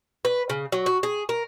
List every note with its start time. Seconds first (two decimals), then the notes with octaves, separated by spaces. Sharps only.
0.25 B4
0.50 C#3
0.72 F#3
0.86 F#4
1.03 G#4
1.29 A#4